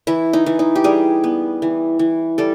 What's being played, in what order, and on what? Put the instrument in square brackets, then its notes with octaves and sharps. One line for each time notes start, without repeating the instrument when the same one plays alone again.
[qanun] E3 E4
D#4
E3
D#4
G4
G3 G#4
B3
E3
E3
G3 A4